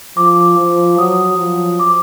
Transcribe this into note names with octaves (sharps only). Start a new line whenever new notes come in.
F3 D6
F3
F#3 D#6
F3
D6